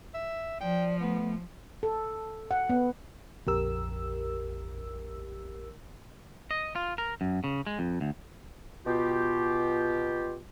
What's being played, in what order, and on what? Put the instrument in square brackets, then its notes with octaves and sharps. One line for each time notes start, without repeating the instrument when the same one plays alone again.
[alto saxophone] E5
[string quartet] F3 [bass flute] D5 [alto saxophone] G5
[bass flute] A3 [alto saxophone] B3
[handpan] A4
F#5
B3
[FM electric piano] A#1 F2 G4 A#4 E6
[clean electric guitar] D#5
F4
A#4
F#2
C#3
G#3
F2
D2
[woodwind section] B2 F4 G4